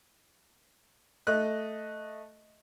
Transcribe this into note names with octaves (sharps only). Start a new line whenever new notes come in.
A3 D#5 F#6